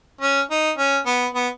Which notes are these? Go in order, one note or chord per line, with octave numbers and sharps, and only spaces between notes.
C#4
D#4
C#4
B3
B3